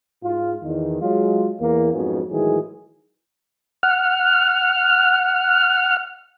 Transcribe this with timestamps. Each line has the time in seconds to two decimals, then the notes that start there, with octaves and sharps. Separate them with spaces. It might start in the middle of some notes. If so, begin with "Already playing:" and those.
0.23 G#2 F4
0.62 E2 D#3
1.01 F#3 G#3 F4
1.60 E2 E3 A#3
1.92 F2 G#2 F#3 B3 C#4
2.30 A2 D#3 E3 F#3 G#3 G#4
3.83 F#5 F6